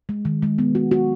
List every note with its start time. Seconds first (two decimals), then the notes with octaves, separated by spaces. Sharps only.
0.09 G#3
0.25 D#3
0.42 G#3
0.58 B3
0.75 F#4
0.91 F#4